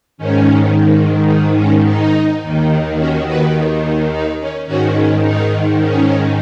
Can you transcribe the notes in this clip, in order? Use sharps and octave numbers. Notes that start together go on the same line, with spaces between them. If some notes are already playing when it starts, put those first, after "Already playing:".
G#2 D#3 C#4
D#4
C#4
D#4
D#2 D#3
C#4 F#4
F#4 B4
D#4
C#4
G#2 D#3 C#4 F#4
C#4
D#4
C#4